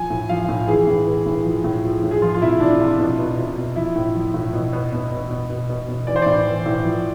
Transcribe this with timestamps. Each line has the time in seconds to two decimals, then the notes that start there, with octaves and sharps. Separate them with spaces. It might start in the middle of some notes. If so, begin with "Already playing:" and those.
Already playing: F3 G#5
0.10 A2
0.29 F3 F5
0.49 A2
0.67 E3 G#4
0.87 A2
1.07 E3
1.26 A2
1.45 F3
1.64 A2
1.84 F3
2.03 A2
2.11 G#4
2.22 F3 F4
2.34 F4
2.42 C3 E4
2.60 F3 D4
2.81 C3 F4
2.99 B2
3.19 B2
3.37 B2
3.57 B2
3.76 F3 E4
3.95 A2
4.15 F3
4.34 A2
4.53 B2
4.73 B2
4.93 B2
5.12 B2
5.31 B2
5.50 B2
5.70 B2
5.89 B2
6.07 E3 D5
6.16 C5
6.22 A2 D5
6.46 E3
6.66 A2
6.85 F3